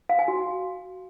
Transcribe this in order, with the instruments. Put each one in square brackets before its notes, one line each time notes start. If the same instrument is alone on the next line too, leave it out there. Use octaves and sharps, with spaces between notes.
[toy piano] F5
G#5
F#4